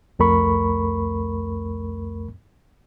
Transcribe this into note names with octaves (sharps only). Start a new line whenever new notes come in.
C2 F2 A3 A#4 B5 C#6